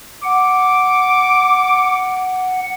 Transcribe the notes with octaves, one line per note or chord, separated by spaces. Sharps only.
F#5 D6